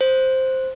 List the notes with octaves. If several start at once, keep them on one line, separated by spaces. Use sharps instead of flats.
C5